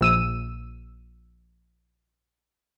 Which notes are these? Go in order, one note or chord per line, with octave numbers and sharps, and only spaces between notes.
A#1 E6 D#7